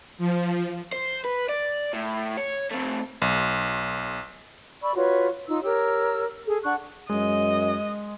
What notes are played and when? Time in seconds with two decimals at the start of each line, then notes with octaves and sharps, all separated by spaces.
0.18 F3
0.92 C5
1.25 B4
1.49 D5
1.93 A2
2.37 C#5
2.72 A3 C4
3.22 B1
4.82 D5 B5 C#6 E6
4.95 F4 F#4 B4 C#5
5.47 D#4 F4 E6
5.63 G4 A#4 C#5 E6
6.45 G#4 A4
6.64 D4 F#5 C#6 F#6
7.10 F#2 G#3 D#5